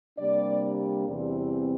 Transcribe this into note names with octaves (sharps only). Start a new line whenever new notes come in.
C3 G3 A#3 D4 D5
E2 C3 E3 G3 C4